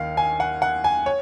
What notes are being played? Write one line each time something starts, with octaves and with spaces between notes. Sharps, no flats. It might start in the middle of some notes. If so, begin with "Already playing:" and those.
Already playing: D#2 D#3 F5
G#5
F#5
F#5
G#5
C#5